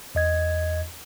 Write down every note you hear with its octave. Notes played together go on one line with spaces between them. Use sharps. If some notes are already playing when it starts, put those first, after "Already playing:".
E2 D#5 G#6